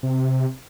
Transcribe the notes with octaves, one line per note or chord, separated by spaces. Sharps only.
C3